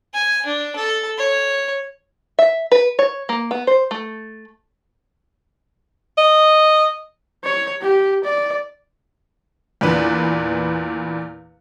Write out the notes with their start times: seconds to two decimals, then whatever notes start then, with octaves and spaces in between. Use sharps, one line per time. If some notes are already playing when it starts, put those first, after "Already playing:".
0.14 G#5
0.46 D4
0.76 A4
1.18 C#5
2.39 E5
2.72 B4
2.99 C#5
3.29 A#3
3.51 B3
3.67 C5
3.91 A3
6.18 D#5
7.44 C#5
7.81 G4
8.24 D5
9.81 E2 A#2 D4 B4